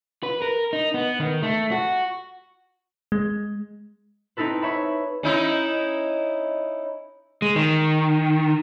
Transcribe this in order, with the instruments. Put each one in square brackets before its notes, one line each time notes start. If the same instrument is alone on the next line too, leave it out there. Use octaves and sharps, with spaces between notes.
[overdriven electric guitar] B4
A#4
D#4
B3
D#3
A3
F#4
[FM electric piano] G#3
[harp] C4 D#4 E4 A4 B4
C#5 E5 B5
[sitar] C#4 D#4 E4
[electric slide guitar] G#3
D#3